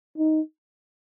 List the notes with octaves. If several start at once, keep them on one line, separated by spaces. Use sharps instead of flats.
D#4